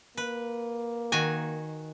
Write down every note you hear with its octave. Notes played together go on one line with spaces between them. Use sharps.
A#3 B4
D#3 F#4 G#5